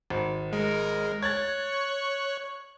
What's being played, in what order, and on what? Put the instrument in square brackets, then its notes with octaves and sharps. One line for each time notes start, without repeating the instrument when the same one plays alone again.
[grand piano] G#1
[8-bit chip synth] G#3 [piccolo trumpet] A#4
[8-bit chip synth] C#5 F#6 [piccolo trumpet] C#6 [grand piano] G#6 A6